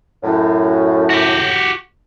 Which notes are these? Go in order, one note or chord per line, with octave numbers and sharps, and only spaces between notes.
F#2 A2
F#4 G4